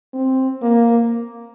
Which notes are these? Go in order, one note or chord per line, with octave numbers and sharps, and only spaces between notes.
C4
A#3